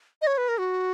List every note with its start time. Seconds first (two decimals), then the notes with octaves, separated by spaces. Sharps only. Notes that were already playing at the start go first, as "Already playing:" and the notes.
0.22 D#5
0.27 C#5
0.38 B4
0.49 A#4
0.59 F#4